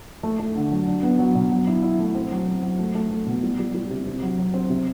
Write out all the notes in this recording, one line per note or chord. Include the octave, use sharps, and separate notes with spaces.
A3
A3
D3
F#3
D4
B3
F#3
B2
F#3
E4
E4
A3
C4
F#3
C4
F#3
A3
A3
A3
B2
G3
G3
G3
C3
C3
F#3
F#3
C4
C3